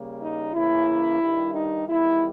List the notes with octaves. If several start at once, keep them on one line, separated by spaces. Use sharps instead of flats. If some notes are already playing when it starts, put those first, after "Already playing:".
Already playing: C#3 G3 A#3
D#4
C#3 E3 A#3 C#4 E4
G2 D#3 G3
D#4
E2 D#3 G3 E4